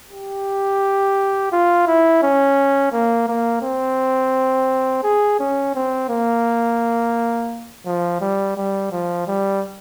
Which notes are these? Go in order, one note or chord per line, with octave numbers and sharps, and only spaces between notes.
G4
F4
E4
C#4
A#3
A#3
C4
G#4
C#4
C4
A#3
F3
G3
G3
F3
G3